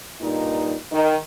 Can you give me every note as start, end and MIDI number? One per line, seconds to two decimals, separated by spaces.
0.21 0.74 43
0.21 0.74 46
0.21 0.74 63
0.92 1.16 51